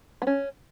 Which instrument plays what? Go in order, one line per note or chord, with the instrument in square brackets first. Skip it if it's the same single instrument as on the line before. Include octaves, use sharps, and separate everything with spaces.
[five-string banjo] B3
C#4